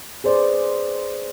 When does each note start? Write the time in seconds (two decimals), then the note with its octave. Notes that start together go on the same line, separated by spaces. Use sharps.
0.24 G#4 B4 C5 D5